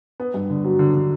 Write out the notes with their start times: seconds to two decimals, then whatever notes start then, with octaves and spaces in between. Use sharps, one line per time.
0.20 B3
0.34 G2
0.50 D3
0.64 F#3
0.79 D3
0.94 D3